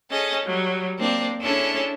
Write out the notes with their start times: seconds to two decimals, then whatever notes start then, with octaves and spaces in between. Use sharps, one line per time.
0.11 C#4 G#4 A4 D#5
0.46 F#3 G3
0.99 A#3 C4 D4
1.41 C#4 D4 E4 G#4 A4 C#5